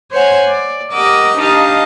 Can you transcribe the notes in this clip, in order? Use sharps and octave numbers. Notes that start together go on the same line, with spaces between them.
C5 C#5 F#5 G#5
D5
G4 A#4 D#5 F#5 D6 E6
D4 D#4 G4 D#5 F5 A5